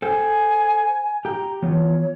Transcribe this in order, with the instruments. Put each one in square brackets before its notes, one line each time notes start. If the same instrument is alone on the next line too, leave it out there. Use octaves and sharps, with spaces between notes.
[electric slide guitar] A4 C5 G5 [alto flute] G#5
[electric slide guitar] G4 G5 [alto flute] A#5
[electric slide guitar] E3 B3 F4 [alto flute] C#5